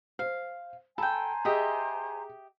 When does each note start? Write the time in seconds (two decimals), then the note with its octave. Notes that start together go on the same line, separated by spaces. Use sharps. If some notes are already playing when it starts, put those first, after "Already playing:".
0.19 C5 F5
0.98 A4 C5 G5 G#5 A#5 B5
1.45 G4 G#4 D#5 E5